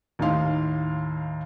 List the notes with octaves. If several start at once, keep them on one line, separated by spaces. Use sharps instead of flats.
D#2 A2 D#4 F5 C6